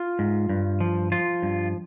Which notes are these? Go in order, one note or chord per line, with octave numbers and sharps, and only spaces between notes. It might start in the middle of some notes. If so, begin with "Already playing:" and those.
Already playing: F4
G#2
G2
F3
F3 F4
G2